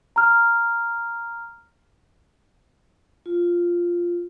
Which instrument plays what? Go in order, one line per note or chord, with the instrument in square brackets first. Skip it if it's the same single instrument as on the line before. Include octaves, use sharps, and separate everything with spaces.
[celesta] A#5 F6
[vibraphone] F4